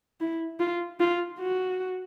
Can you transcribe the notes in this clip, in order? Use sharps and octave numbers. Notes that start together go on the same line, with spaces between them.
E4
F4
F4
F#4